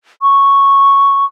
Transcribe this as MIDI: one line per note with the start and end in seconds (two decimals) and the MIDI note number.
0.22 1.25 85